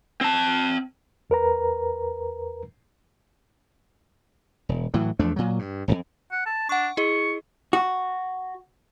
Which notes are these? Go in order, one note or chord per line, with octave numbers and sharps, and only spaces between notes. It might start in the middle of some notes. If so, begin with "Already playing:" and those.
C4 A5
E2 A#4 B4 A#5
E1
A2 E3 F#3
E2 F3 A3 D4
A#2 F#3
G2
D#1 F2
F#5
A5
D4 F#5 C#6
E4 G#4 D#5 C#6
F#4